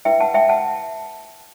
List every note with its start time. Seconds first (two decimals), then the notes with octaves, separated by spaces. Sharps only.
0.05 E4 B4 E5 G5
0.20 F#5 A5
0.34 E5 G5
0.49 F#5 A5